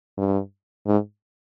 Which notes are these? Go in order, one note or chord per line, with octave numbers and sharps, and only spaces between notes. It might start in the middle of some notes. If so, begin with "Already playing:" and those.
G2
G#2